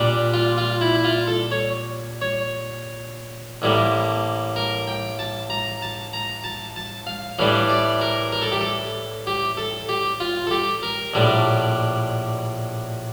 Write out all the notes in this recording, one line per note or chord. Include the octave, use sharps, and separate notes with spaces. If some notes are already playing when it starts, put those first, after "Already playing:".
Already playing: A#2 G3 D4
F4
F4
E4
E4
F4
A4
C#5
C#5
A1 A2 G3 A#3
A#4
G5
A5
A#5
A5
A#5
A5
A5
F5
A2 E3 G3 D4 F5
D5
A#4
A#4
A4
G4
A4
G4
A4
G4
F4
A4
G4
A#4
A#1 A2 G3 D4